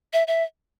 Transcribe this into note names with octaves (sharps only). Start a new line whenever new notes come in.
E5
E5